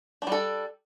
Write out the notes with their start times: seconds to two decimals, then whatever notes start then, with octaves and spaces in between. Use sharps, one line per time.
0.22 D4
0.27 G3
0.32 A4